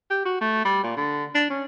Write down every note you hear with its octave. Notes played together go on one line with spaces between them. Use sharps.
G4
F#4
A3
G3
A#2
D3
D4
C#4